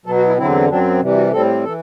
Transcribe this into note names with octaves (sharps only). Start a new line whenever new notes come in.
B2 F#3 B3 A4
F#4
E4
E2 D3 F#3 C4 E4
F#2 F#3 C4 D4
C3 E3 G3
F#4
A2 G3 C4 A4
E3 A4